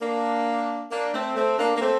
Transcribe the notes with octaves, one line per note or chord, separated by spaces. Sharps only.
A#3 D4
A#3 D4
A3 C4
A3 C4
A#3 D4
A#3
A3 C4